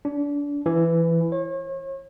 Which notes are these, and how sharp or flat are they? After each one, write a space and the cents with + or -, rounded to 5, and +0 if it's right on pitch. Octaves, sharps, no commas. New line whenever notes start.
D4 -30
E3 +15
C#5 -40